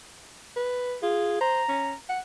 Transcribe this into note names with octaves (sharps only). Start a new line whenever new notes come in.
B4
F4 G#4
C5 A#5
C#4
F#5